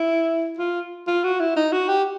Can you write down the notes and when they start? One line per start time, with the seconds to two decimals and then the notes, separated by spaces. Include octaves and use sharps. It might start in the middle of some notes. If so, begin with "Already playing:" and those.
Already playing: E4
0.58 F4
1.07 F4
1.24 F#4
1.40 E4
1.56 D#4
1.73 F#4
1.88 G4